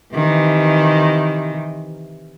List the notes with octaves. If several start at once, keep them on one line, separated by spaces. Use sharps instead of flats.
C3 D#3 E3